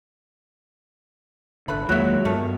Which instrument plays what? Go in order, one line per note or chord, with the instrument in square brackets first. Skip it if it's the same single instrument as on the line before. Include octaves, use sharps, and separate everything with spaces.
[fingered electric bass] G#1 D3 [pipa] A3 B4 B5
[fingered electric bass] E2 D#3 A#3 [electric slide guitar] F#3 G#3 [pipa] F#4 E5
[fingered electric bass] G2 B3 [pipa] D#3 A3